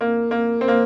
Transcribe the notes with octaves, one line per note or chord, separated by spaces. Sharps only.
A#3
A#3
C4
A#3